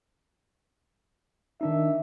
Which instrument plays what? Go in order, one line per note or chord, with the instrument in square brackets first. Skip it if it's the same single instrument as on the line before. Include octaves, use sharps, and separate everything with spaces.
[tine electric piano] D#3 D4 D#4 [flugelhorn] E5